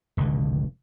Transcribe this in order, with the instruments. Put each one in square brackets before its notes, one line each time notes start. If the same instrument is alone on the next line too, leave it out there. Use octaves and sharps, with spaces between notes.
[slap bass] F1 C#2 A2 D3